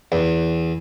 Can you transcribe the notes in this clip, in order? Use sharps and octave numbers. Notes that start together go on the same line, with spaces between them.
E2